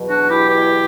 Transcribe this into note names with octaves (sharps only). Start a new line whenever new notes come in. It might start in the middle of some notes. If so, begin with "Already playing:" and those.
Already playing: E2 B2 F#3
D4 F#4
E4 G4
E4 G4